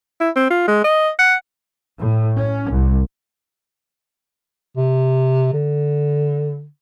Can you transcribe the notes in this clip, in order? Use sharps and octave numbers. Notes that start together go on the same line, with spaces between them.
E4
C4
F4
G#3
D#5
F#5
A2
C#4
C2
C3
D3